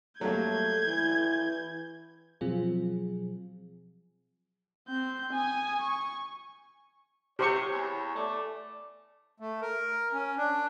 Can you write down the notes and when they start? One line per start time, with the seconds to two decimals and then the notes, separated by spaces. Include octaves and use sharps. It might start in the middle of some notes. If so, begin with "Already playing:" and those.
0.21 F#3 G3 A3 A#3 G6 G#6
0.88 E3
2.41 B2 F3 F#3 C4 F4 G#4
4.88 C4 G6
5.33 G#5 D#6
5.81 C#6
7.39 C3 G4 C5 C#5 C#6
7.72 E2
8.15 A3 D5
9.40 A3
9.61 A#4
10.13 C#4
10.37 D4